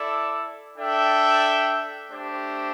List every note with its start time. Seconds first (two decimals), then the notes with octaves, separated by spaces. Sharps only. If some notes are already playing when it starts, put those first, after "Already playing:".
Already playing: E4 A4 D5
0.77 D4 A4 E5 G5
2.10 A3 D4 G4 C5